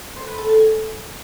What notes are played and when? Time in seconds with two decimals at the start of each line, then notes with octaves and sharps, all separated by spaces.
0.16 C5
0.27 B4
0.38 A4
0.49 A5
0.60 G#5